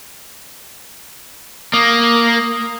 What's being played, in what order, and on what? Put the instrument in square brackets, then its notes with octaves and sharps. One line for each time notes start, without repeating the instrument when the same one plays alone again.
[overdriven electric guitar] A#3 [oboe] D#6